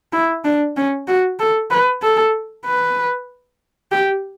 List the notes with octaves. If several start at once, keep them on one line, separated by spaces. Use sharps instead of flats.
E4
D4
C#4
F#4
A4
B4
A4
B4
G4